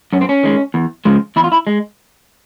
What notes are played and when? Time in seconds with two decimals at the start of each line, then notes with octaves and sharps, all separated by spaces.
0.13 F#2 C#4
0.21 C4
0.29 C#4
0.43 D#3 G#3
0.74 E2
1.05 C#3 F3 G#3
1.36 E2 E4
1.44 F4
1.52 E4
1.67 G#3